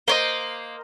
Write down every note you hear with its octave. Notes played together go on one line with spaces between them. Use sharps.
A#3 C5 C#5 D#5